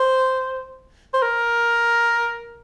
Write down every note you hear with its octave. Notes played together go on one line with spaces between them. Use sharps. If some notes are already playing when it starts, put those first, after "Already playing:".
Already playing: C5
C5
A#4